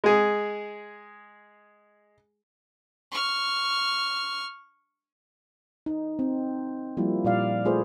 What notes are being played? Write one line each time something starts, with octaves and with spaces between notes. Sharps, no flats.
G#3 G#4
C#6 F6
D#4
C4
F3 G3 A#3 E4
A#2 G3 D5 F5
A3 F4 G#4 B4 C5